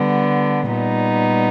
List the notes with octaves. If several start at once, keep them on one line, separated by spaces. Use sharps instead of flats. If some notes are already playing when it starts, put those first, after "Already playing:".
Already playing: D3 G3 B3
A#2 G3 B3 D#4